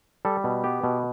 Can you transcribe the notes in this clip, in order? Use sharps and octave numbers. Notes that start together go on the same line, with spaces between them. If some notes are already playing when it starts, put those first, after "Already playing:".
G3 A4
B2
B3 G4
B2